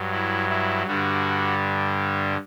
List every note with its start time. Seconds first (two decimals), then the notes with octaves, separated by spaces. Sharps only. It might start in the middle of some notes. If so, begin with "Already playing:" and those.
Already playing: G2 F#3
0.12 E4
0.49 E4
0.87 G2 D3 G3 F#4